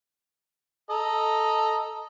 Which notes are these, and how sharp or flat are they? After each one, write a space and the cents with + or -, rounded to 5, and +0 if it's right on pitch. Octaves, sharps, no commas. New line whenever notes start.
A4 +0 D#5 +0 A#5 +0